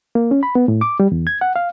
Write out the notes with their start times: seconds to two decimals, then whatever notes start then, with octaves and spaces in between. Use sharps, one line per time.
0.15 A#3
0.31 C#4
0.43 B5
0.55 B3
0.68 A2
0.81 D6
1.00 G3
1.12 E2
1.27 G#6
1.41 F#5
1.56 F5